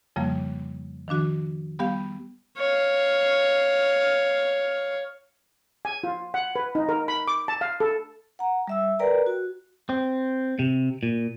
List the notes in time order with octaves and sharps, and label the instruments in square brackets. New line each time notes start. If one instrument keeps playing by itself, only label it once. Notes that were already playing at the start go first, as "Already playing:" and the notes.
[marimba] F2 C#3 F3 G3 A#3
D#3 F3 D4 F#4
G3 B3 G4 F5
[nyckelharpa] C#5 F5
[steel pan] G#5
F4
F#5
B4
D#4
A#4
B5
D6
A5
F5
A4
[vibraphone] F#5 A#5
G3 E5 E6
A#4 B4 D5 G5 A#5
F#4
[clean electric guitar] C4
C3
A#2